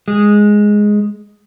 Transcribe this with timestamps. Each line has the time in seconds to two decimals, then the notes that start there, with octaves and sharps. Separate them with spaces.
0.08 G#3